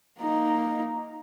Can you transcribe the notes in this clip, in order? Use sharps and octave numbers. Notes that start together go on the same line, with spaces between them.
A#3 D#4